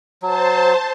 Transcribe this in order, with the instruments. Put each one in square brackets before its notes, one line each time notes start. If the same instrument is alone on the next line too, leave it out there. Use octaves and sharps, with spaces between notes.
[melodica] F#3 [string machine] C5 A5